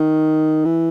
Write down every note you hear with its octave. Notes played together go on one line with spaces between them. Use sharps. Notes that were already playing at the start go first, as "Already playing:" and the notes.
Already playing: D#3
E3